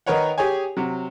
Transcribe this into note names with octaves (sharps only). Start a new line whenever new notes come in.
D#3 D#4 A#4 B4 C#5 F#5
G4 G#4 C#5 G#5
C3 F#3